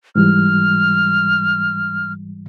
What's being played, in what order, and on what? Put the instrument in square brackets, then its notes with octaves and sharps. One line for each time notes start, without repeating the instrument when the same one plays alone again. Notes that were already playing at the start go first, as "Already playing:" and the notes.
[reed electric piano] G#2 E3 G3 [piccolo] F6